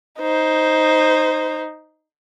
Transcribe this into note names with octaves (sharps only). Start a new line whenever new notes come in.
D#4 C5